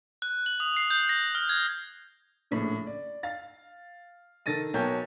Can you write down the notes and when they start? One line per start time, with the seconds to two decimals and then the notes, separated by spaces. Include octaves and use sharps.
0.22 F#6
0.46 F#7
0.60 D#6
0.77 C7
0.90 G6
1.09 A#6
1.35 F6
1.49 G#6
2.51 A#1 A2 C#3
2.87 D5
3.23 F5 A6
4.46 D#3 A4 A6 A#6 D#7
4.74 B1 A#4 C#5 G5 A5 G6